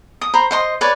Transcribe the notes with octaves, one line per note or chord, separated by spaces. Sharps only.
D#6
C5 A#5 B5
C5 D#5 C6
B4 C#5 D5